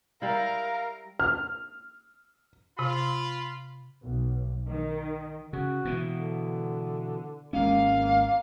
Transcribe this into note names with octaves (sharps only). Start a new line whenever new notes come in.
G3 E4 A#4 F5
F6
C3 F4 B5
B1
D#3
C#3 F#4
B2 E3
D3
G#1 G#3 A#3 C#4 F5